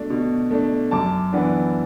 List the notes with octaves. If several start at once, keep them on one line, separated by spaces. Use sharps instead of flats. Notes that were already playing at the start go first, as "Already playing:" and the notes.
Already playing: B2 A3 D4
B2
A3 D4
F#2 A5 D6
E3 B3 D4